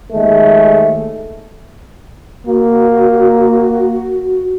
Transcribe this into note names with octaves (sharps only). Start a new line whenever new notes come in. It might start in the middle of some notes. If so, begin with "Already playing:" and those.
D#2 G#3 A3
A#3 F#4